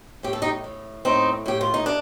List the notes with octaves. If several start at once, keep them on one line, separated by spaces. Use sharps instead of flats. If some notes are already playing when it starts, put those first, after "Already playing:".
A2 G4
A4
D#4 G4
A2
A2 C4 D#4
A2 G4
F4
D#4
D4